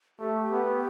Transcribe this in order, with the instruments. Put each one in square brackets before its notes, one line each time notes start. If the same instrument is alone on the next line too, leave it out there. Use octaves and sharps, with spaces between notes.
[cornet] A3 [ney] G4
[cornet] B3